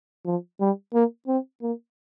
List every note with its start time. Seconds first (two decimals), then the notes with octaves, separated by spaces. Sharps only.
0.26 F3
0.60 G3
0.94 A#3
1.28 C4
1.62 A#3